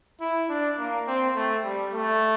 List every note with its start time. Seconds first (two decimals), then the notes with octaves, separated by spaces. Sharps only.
0.21 E4
0.49 D4
0.79 A#3
1.08 C4
1.35 A3
1.64 G3
1.93 A3